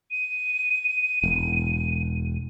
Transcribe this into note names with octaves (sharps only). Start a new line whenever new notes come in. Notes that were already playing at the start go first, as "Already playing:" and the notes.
D#7
E1